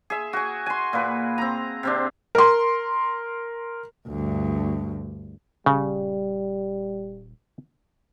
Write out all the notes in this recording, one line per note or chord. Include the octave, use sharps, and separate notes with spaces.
G#4 E5
F#4 G#5
G#5 C6
A#2 B4
C4 A#5
C3 C4 D4
A#4 C6
D2 G2
D#1 C#3 G3